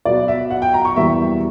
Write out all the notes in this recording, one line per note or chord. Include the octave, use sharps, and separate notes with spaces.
B2 F#3 B3 D5
E5
F#5
G5
A#5
C#6
E2 B2 G3 A#3 E5